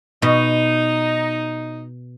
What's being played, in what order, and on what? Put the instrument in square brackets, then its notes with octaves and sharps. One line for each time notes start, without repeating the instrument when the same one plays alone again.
[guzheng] B2 [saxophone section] D#4